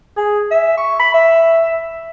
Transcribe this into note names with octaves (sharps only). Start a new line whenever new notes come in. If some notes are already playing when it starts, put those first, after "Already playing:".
G#4
E5
C#6
B5
E5